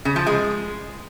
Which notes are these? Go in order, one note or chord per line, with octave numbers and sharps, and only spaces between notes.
C#3
F3
G#3